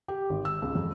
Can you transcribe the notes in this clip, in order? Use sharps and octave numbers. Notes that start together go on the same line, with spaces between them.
G4
G#1
E6
C#2
F2